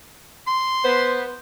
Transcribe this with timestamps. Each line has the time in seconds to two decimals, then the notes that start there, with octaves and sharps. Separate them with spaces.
0.47 C6
0.85 B3 C5